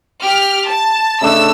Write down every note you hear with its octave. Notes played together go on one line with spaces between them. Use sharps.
G4 F6
A5
C#3 A3 D4 E6